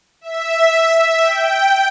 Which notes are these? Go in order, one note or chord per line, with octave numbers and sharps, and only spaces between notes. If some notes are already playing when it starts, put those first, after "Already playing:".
E5
G5